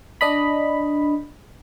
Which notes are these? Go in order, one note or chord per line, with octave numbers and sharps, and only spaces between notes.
D4 D#5 B5